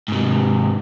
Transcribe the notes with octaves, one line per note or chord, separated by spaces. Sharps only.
G#2 C3